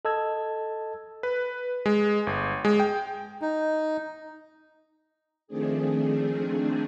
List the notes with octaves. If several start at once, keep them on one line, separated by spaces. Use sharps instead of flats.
A4 D#5 A5 E6 G#6
B4
G#3
G1
G#3
G5
D#4
D#3 F3 A3 C4 D4 G#4